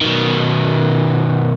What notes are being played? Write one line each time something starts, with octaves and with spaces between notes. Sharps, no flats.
B2 D#3